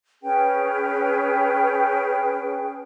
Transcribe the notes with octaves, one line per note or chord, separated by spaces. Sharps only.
C#4 G#4 B4 G5